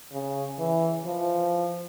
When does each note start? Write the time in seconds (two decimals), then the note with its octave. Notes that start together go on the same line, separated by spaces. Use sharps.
0.12 C#3
0.59 E3
1.05 F3